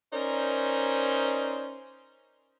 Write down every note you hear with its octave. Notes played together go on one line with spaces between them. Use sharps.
C#4 D#4 A#4 C5 D5